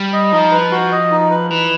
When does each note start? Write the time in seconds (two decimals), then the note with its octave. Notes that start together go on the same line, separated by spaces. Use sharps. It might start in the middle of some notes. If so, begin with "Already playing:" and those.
Already playing: G3
0.13 D#5
0.32 F3 D#4
0.52 B4
0.72 F#4
0.92 D#5
1.11 D#4
1.30 B4
1.50 E3 B4